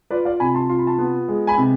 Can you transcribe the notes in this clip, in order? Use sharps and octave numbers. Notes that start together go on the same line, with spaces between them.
F4 B4 D5
D5 F5
C3 G#5 B5
A5 C6
F4 C6
B5
A5 C6
B3
G#3
G#5 B5
C3